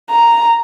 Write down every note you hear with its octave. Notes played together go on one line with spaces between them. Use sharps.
A#5